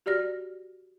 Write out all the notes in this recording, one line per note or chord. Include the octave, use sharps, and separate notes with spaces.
F#4 G4 D5 F6 A#6